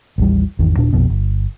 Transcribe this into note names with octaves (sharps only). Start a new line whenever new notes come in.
A1 D#2 G3
G#1 E2 D#3
D#1 A#2 D4
A#1 F2 B2
G1